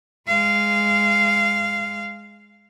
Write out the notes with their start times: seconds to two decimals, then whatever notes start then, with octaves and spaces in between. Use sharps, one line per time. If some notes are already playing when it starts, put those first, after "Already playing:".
0.27 G#3 F5